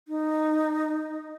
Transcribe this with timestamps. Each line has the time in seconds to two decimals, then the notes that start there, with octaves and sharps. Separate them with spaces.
0.08 D#4